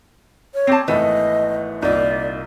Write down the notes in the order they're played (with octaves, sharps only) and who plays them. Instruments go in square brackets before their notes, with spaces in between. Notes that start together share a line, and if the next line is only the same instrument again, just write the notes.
[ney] C#5
[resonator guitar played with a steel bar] C4 A5 [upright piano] D6 G6 C7
[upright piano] G#1 A3 B3 [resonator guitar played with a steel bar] E3 [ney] D#5
[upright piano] C2 A#2 [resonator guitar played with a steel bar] A#3 D#4 [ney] D5